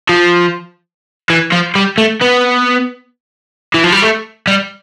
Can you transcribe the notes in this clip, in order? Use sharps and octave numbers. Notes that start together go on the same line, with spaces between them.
F3
E3
F3
G3
A3
B3
E3
F3
G3
A3
G3